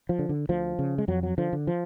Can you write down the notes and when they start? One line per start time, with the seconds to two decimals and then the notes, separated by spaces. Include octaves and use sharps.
0.09 F3
0.19 D3
0.29 D3
0.49 D2 F3
0.79 C#3
0.98 G#3
1.08 F2 F#3
1.23 F#3
1.38 D3 F3
1.53 D3
1.67 F3